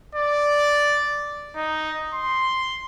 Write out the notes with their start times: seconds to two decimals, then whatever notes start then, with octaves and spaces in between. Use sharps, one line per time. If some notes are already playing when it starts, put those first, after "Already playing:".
0.15 D5
1.56 D#4
2.14 C6